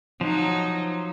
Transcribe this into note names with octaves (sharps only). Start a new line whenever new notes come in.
F3 F#3 D#4